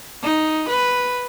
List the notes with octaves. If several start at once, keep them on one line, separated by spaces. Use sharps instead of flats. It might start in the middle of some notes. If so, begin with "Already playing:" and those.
D#4
B4